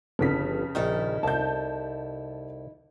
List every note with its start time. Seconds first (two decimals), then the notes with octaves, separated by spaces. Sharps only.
0.19 G1 F2 C#3 B6
0.75 A#1 D#3 D#4 E4 A4
1.23 C2 A5 G6